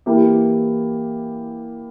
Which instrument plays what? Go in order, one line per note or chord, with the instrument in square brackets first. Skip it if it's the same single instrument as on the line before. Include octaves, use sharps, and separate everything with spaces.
[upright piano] E3 A#3 E4 G4